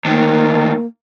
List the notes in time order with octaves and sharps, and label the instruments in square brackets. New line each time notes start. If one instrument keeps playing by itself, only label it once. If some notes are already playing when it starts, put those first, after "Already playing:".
[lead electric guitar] D2 D#3 [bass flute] A#3